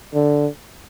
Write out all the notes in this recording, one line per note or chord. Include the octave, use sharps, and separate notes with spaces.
D3